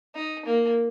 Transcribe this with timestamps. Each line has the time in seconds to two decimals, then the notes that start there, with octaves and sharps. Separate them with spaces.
0.15 D#4
0.46 A#3